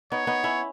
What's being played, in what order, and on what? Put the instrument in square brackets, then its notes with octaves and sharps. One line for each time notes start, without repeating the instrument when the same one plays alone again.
[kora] B3 D#4 [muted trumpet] C#5
[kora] B3 D#4
C#4 E4